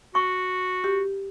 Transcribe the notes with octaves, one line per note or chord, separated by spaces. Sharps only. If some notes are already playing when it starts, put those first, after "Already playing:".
F#4 C#6
G4